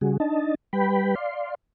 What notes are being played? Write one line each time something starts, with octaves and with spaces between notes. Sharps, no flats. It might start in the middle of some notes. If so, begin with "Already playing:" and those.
C#3 G3 F#4 G#4
D4 D#4 D#5 A5
G3 B4 G5 B5
D5 F5 C6